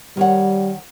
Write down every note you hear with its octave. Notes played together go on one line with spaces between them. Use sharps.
D#3 G3 C#5 F#5